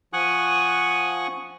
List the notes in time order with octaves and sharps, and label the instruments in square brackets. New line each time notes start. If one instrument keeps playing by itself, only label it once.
[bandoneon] F3 F#5 G#5 C#6 D#6 F#6